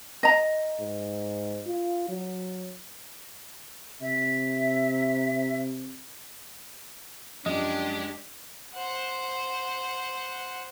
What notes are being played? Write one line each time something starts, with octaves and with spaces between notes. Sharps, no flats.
D#5 A#5
G#2
F4
F#3
C3 E5
F#2 F3 G#3 D4 G4 D#5
C5 F#5